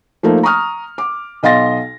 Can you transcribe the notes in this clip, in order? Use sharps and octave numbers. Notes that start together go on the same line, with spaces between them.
F3 A3 A#3 D#4
A#5 C#6 D#6 F6
D6
B1 D#5 F5 C6 A6 A#6